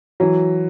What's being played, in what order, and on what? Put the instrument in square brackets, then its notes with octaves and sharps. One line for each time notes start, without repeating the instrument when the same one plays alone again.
[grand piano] E3 [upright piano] F#3